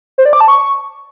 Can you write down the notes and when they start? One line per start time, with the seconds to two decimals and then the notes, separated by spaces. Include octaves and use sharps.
0.18 C5
0.25 D5
0.33 D6
0.41 A5
0.48 C#6